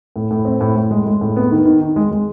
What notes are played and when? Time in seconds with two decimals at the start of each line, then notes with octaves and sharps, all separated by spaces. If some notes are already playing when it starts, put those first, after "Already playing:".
0.16 A2
0.31 A2
0.45 C4
0.61 A2
0.76 A2
0.91 G#3
1.06 G#3
1.21 A2
1.36 B3
1.51 D#3
1.66 D#3
1.81 D#3
1.96 G#3
2.11 G#3